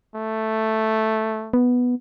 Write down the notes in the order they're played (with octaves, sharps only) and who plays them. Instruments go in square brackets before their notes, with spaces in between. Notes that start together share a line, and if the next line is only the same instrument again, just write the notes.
[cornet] A3
[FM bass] B3